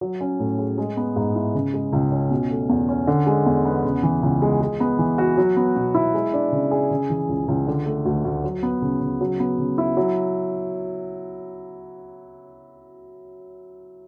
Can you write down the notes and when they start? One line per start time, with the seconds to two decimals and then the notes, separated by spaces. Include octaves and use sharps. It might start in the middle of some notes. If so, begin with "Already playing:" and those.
0.01 F#3
0.21 C#4
0.40 A2
0.59 G#4
0.78 G#3
0.97 B3
1.16 G#2
1.35 E4
1.55 C#3
1.74 G#3
1.93 C#2
2.12 C#4
2.31 B2
2.50 A3
2.69 E2
2.89 C#4
3.07 D3
3.27 G#3
3.46 E2
3.65 B3
3.85 C#3
4.03 E3
4.23 C#2
4.42 G#3
4.61 G#3
4.80 B3
4.99 E3
5.18 F#4
5.37 F#3
5.57 B3
5.76 B2
5.94 E4
6.14 G#3
6.33 D4
6.52 C#3
6.71 G#4
6.91 C#3
7.10 E3
7.29 C#2
7.48 C#2
7.67 D3
7.86 A3
8.05 D2
8.25 D2
8.44 F#3
8.63 B3
8.82 C#3
9.01 C#3
9.21 F#3
9.40 B3
9.58 C#3
9.78 E4
9.97 F#3